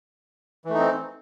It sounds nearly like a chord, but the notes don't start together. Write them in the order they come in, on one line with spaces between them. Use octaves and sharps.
E3 A3 D#4 C4